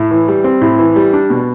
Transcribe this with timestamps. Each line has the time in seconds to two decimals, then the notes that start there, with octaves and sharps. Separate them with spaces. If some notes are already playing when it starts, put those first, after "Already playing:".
Already playing: A2
0.11 E3
0.28 G3
0.44 C4
0.62 A2
0.79 E3
0.96 G3
1.13 D4
1.30 B2